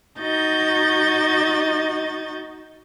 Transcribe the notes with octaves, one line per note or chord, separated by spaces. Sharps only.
D#4 F#4 D#5 G6 A6